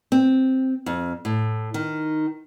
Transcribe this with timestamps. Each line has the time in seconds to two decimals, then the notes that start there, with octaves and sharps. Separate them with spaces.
0.12 C4
0.86 F2
1.25 A2
1.74 D#3